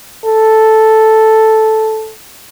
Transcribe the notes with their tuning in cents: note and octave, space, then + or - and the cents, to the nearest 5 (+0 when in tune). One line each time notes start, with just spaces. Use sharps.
A4 -5